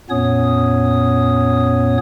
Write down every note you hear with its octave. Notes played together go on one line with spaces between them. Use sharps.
F2 A#2 B3 C#4 C#5 D#6